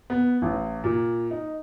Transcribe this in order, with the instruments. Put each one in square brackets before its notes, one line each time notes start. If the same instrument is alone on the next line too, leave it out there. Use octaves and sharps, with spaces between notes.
[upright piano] B3
A1
A#2
D#4